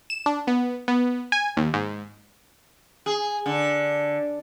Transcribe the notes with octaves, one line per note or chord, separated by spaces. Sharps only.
E7
D4
B3
B3
G#5
D#2
G#2
G#4
D3